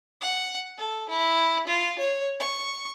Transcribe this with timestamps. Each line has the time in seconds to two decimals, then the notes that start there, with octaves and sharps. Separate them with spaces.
0.21 F#5
0.78 A4
1.09 E4
1.67 F4
1.99 C#5
2.39 C#6